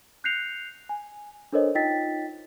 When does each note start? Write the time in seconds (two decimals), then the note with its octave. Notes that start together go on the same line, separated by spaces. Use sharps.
0.24 F#6 G6 A#6 C7 C#7 F7
0.89 G#5
1.53 D4 A4 A#4 C5 C#5 D#5
1.75 D#4 F4 D#5 G5 A6 B6